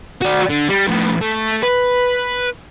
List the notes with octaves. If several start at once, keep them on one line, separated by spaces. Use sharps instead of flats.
F#4 D5
D3
G3
A2 F3
A3
B4